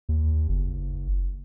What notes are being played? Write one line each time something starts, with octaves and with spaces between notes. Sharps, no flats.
D#2
F#1